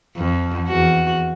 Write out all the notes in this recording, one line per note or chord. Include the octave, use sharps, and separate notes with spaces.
F2
E2 F#4